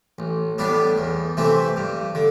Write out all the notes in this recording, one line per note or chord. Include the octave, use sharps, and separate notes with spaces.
A1
A2 G3 B3 D4
E2
C3 E3 A3 C4
G2
D3